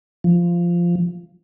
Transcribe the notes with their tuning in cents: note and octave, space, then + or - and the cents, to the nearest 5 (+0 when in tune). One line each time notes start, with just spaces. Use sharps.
F3 -10